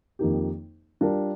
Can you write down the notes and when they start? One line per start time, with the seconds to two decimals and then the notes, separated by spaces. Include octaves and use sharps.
0.19 F2 D#3 A#3 D#4 G4
1.01 G3 D4 F4 A#4